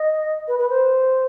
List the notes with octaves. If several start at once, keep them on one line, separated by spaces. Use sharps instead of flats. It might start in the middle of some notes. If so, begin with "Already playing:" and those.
Already playing: D#5
B4
B4
C5